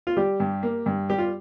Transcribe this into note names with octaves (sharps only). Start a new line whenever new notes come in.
F4
G3 G4
G2
A#3
G2
G3 G4
F4